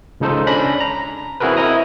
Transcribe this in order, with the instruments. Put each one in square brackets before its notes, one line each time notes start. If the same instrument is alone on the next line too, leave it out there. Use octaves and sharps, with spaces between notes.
[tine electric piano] C#2 C#3 D#4 A4 C5
C#4 D4 B5 A#6
A#5
C4 E4 F#4 G#4 A#4 B4
E4 D#5 A#5 D#6